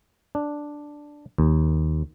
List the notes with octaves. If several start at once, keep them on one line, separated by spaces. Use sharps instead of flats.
D4
D#2